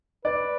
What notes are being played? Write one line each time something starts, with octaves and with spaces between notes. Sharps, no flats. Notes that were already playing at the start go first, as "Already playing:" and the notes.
B4 D5